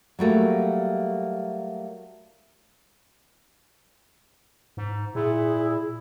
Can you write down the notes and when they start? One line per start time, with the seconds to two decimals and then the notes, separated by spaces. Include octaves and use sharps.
0.19 F#3 G3 A3 A#3
4.77 G#2
5.15 A#2 E4 G#4